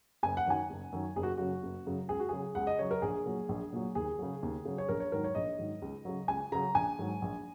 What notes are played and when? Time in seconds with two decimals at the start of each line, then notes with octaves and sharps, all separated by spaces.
0.23 F#1 G#5
0.37 F#5
0.46 F#2 D#3 F#3 G#5
0.70 F#1
0.93 F#2 D#3 F#3
1.16 F#1 G#4
1.23 F#4
1.37 F#2 C#3 F#3 F#4
1.63 F#1
1.86 F#2 C#3 F#3
2.09 C#2 G#4
2.19 F#4
2.29 C#3 F#3 G#4
2.55 C#2 F#5
2.67 D#5
2.79 C#3 F#3 C#5
2.91 A#4
3.02 A#1 G#4
3.26 A#2 F#3
3.49 A#1
3.73 A#2 F#3
3.95 D#2 G#4
4.19 C#3 F#3
4.43 D#2
4.65 C#3 F#3
4.78 C#5
4.89 A#1 A#4
5.00 C#5
5.12 G#2 D#3 F#3 A#4
5.24 C#5
5.35 A#1 D#5
5.58 G#2 D#3 F#3
5.82 C#2
6.05 C#3 F#3
6.28 C#2 G#5
6.52 C#3 F#3 A#5
6.75 A#1 G#5
6.99 G#2 D#3 F#3
7.22 A#1